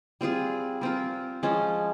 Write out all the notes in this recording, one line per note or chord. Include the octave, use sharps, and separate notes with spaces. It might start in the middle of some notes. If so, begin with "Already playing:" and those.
G3 C4 F4 G#4
G3 C4 F4 A#4
F3 G#3 C#4